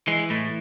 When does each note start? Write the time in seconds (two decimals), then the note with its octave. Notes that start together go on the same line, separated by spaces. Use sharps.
0.07 E3 G#3
0.30 A2 A3